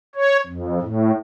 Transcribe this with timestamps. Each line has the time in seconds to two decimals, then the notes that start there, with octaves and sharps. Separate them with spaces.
0.15 C#5
0.47 F2
0.82 A2